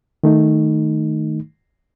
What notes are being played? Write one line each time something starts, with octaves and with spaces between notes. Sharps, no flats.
D#3 A3 D#4